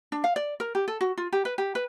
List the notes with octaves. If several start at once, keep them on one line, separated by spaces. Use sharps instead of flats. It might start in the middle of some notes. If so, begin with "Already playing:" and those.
D4
F5
D5
A#4
G4
A4
F#4
F4
G4
B4
G4
B4